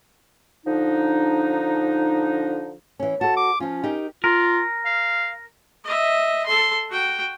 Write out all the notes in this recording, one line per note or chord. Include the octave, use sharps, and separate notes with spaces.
D3 F3 D4 D#4
E3 C#4
F#4 A4 A5
D6
F3 C#4 F4
D#4 G4 A#4
F4 A#4
F5
D#5 E5
A4 C6
F#4 G5